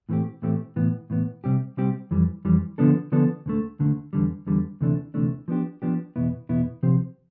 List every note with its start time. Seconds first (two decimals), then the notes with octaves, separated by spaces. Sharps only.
0.09 A2 E3 A3 C4 G4
0.42 A2 E3 A3 C4 G4
0.76 A2 E3 B3
1.10 A2 E3 B3
1.44 C3 G3 C4 G4
1.77 C3 G3 C4 G4
2.11 F2 E3 G3
2.45 F2 E3 G3
2.78 D3 F3 B3 D4 A4
3.12 D3 F3 B3 D4 A4
3.46 D2 D3 A3
3.79 D2 D3 A3
4.13 E2 D3 G3
4.47 E2 D3 G3
4.81 D2 C3 E3 A3 D4
5.14 D2 C3 E3 A3 D4
5.48 F3 B3 D4 G4
5.82 F3 B3 D4 G4
6.16 E2 B2 B3 E4
6.49 E2 B2 B3 E4
6.83 C3 F3 C4 G4 C5